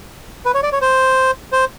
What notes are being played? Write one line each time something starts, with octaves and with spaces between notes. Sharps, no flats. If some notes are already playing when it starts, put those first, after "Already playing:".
B4
C#5
D5
C#5
C5
C5